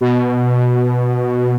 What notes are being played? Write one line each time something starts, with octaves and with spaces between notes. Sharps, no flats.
B2